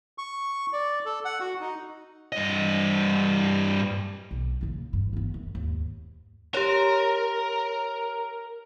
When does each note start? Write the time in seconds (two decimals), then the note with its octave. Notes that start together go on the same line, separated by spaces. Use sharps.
0.18 C#6
0.73 D5
1.06 A4
1.25 F#5
1.41 F#4
1.61 D#4
2.32 G2 D#5
4.31 B1
4.61 C#3 A#3
4.93 G2
5.13 B3 C4
5.34 F#2
5.55 D#2 G#2
6.54 G4 A#4 C#5